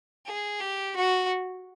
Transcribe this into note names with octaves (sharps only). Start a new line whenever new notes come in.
G#4
G4
F#4